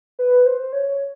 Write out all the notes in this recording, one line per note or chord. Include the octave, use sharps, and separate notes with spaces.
B4
C5
C#5